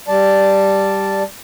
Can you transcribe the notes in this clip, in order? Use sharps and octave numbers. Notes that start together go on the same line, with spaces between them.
G3 D5 A5